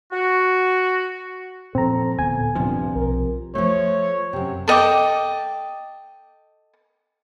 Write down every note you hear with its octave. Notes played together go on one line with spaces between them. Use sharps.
F#4
A#2 F3 C4 A4 A#5
D1 A#2 B3 G#5
G2 C3 F3
B1 A#4
F3 A3 C#5
F#2 C3
A4 D#5 G5 D6